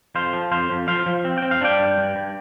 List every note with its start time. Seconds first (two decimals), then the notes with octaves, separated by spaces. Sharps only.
0.15 F2 C5 F5
0.33 F3
0.51 F2 C5 F5
0.70 F2
0.88 F3 C5 F5
1.06 F3
1.25 C4
1.38 C4 G5
1.51 F5
1.61 D4 D5 G5
1.79 G2
1.98 G2
2.16 G2